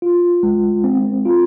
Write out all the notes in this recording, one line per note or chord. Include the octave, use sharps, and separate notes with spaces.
F4
G#3
C4
F4